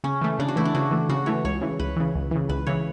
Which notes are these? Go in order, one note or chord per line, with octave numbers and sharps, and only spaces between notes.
C#3 C#4
E3 A3
C#3 D4
F#4
E3 A3 E4
D4
C#3 F#4
E3 A3
C#3 F#4
E3 A3 C#5
C#2 C#5
C#3 E3
C#2 B4
C#3 E3
C#2
C#3 E3
C#2 B4
C#3 E3 C#5